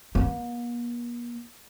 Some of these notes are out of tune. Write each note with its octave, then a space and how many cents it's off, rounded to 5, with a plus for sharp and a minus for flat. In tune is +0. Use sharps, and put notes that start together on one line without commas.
A#3 +45